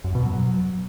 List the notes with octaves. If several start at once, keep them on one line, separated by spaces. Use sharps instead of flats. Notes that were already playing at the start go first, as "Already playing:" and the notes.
F#2
B2
F#3